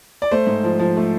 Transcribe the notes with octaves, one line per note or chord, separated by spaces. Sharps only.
D5
A3 C5
G#2
F3
F3
A3